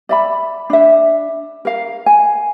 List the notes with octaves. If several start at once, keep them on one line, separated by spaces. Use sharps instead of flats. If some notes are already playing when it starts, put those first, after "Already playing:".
D5 E5 B5
D4 E5
A#4 F5
G#5